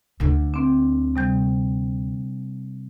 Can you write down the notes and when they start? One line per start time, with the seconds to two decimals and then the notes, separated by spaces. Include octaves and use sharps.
0.20 D2 D3
0.54 C4 D4
1.16 C3 G3 G6